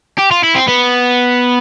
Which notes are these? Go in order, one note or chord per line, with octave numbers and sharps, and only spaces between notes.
G4
F4
E4
C4
B3